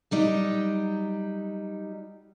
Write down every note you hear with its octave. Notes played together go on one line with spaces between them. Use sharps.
F#3 G3 D#4